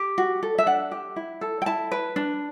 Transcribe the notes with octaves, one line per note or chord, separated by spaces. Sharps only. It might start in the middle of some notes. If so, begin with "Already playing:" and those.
Already playing: G4
F#4
A4
E5
D4 F#5
G4
E4
A4
G5
E4 A5
B4
D4